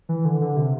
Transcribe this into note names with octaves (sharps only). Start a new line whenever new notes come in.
E3
D3
D3
C3